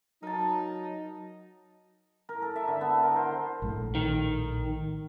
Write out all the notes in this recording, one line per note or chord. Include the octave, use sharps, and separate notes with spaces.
F#3 D#4 A#4 A5
A#4
A4
E5
D3
B3
A#4
C5
A#1 A2 A3
D#3